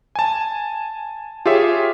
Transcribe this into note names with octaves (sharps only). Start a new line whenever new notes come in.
G#5 A5
F4 G4 G#4 C#5 E5